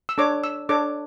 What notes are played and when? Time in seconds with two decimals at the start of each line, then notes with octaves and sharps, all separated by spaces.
0.09 E6
0.18 D4 A4 C#5 D6
0.44 E6
0.69 D4 A4 C#5 D6